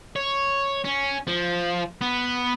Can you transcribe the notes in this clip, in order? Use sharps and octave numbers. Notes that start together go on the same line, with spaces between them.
C#5
C#4
F3
B3